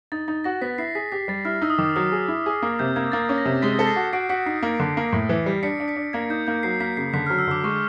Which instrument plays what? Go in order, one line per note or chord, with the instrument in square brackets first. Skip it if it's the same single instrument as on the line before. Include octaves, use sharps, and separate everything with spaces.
[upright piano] D#4 [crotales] A6
[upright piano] D#4 [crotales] A6
[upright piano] F#4 [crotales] A#6
[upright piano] B3 [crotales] B6
[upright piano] E4 [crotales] C7
[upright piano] G#4 [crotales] B6
[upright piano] G4 [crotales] B6
[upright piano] G3 [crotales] A6
[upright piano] E4 [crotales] F6
[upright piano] D#4 [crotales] E6
[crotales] D#6
[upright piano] D#3 [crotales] D6
[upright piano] F#3 [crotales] D#6
[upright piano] G#4
E4
G#4
A#3
[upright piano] C3 [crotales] G6
[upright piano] A#3 [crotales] G#6
[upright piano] A#3 [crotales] A6
[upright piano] C#4
[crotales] A#6
[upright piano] C3
[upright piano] G#3 [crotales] B6
[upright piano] A4
[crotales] C7
[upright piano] F#4
[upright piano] F#4 [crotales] C7 D7
[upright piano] F#4 [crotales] B6 C#7
[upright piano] D#4 [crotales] C7
[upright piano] A#3
D3
A#3
A2
E3
G3
[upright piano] D4 [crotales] B6 C#7
[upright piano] D4
[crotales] B6 C#7
[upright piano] D4
[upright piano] A#3 [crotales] G#6
[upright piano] D#4 [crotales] G6
[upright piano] A#3 [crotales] G6
[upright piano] F#3 [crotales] C7
[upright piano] A#3 [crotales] B6
[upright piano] C#3 [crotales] C7
[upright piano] D3 [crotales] B6
[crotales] F6
[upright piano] F#3
[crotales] E6
[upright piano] D3 [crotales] D6
[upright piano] G#3 [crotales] C#6